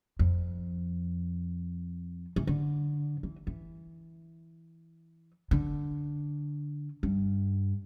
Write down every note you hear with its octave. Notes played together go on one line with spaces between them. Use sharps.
F2
E3
D3
E3
E3
D3
G2